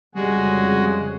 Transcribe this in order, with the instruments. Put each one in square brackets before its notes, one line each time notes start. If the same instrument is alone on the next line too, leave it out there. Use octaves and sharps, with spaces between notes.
[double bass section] F2 C#3 [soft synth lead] G3 [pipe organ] G#3 F#4 G#4